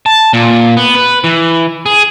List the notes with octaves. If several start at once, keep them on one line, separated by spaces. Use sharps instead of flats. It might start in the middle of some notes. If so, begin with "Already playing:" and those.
A5
A#2
B3
B4
E3
G#4